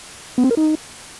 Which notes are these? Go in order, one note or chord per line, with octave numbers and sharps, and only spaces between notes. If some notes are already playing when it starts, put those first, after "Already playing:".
B3
C4
A#4
D#4